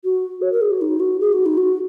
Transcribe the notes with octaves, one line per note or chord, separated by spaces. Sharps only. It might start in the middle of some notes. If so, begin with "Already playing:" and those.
F#4
C#5
A#4
G#4
F#4
D#4
F#4
G#4
F#4
D#4
F#4